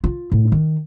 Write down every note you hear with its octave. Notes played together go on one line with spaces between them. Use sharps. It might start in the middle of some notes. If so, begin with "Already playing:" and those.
F4
A2
D#3